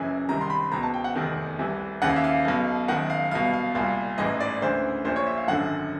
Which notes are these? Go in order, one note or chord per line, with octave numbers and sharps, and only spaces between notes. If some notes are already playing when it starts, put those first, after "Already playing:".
Already playing: F#1 F#2 C#3 E3 G#5
C2 C3 D#3 A#5
C6
B5
C#2 B2 A#5
A5
G5
F#5
F1 E2 C3 D#3
C2 C3 E3
D#2 C#3 E3 F#5
F5
E5
F5
B1 B2
F#1 F#2 D#3 F#5
F5
C2 B2 F5
F5
C2 A#2 F5
A1 G#2 E3 D#5
D5
D2 C#3 E3 C5
A#1 A#2 C5
C#5
E5
F5
G#1 F#2 D3 F#5